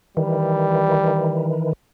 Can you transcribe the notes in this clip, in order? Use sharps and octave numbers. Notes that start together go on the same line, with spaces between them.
D#3 E3 G3